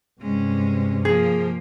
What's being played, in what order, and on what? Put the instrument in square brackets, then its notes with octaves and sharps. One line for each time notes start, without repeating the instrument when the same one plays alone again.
[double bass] G2 C3 [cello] G#3 C#4
[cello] F3 A#3 [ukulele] G#4